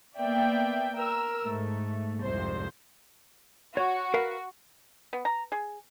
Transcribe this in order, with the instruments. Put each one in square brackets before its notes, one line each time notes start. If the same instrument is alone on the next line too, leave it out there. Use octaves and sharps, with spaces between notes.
[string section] A#3 B3 D5 E5 G5
A#4 E6
G#2 A3
C2 F2 G#2 C3 C5
[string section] F#4 [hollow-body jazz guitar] C#5
[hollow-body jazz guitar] A#4 B4 F5
[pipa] B3
A#5
G#4